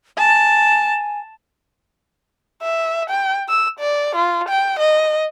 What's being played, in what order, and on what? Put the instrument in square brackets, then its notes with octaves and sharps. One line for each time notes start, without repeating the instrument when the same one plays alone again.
[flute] G#5 [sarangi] A5
[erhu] E5
G5
E6
D5
F4
G5
D#5